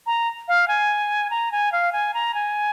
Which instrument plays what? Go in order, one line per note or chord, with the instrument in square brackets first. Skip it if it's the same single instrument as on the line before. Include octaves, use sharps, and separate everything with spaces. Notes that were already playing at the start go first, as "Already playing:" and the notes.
[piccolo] A#5
F5
G#5
A#5
G#5
F5
G#5
A#5
G#5